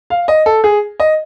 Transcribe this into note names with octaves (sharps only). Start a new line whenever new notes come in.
F5
D#5
A4
G#4
D#5